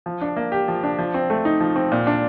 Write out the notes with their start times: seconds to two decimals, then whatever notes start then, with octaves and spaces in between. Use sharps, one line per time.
0.06 F3
0.22 D4
0.37 A#3
0.52 G4
0.68 F3
0.83 D4
0.99 F3
1.14 C4
1.30 A3
1.45 D#4
1.60 F3
1.76 C4
1.92 A#2
2.07 D4